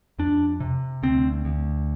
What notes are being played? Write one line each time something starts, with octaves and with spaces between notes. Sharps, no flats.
F2 D4
C3
D2 C4
D2